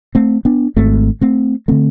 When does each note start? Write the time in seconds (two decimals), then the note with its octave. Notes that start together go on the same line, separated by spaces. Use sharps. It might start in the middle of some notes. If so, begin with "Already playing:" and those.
0.15 A3 C4
0.45 B3 D4
0.76 G#1 G#2 A3 C4
1.21 A3 C4
1.68 D3 A3 C4